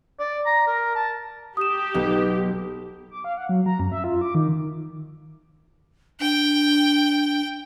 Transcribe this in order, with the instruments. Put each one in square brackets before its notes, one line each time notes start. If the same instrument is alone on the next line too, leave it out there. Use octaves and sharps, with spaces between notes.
[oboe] D5
A#5
A#4
A5
[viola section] G4 [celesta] D#6 E7
[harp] B1 B3
[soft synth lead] D6
F5
F#5
F#3
A#5
F#2
E5
F4
D6
D#3
[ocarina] D4 [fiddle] G5